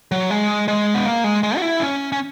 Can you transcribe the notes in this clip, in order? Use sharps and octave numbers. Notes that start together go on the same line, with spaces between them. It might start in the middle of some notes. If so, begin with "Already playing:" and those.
F#3
G#3
G#3
B3
A#3
G#3
G#3
F#4
E4
C#4
C#4